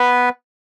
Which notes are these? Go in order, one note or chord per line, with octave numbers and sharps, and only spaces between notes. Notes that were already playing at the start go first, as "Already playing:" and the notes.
Already playing: B3 B4